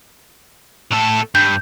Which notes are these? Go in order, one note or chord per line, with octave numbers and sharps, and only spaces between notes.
A2 A4
G2 G6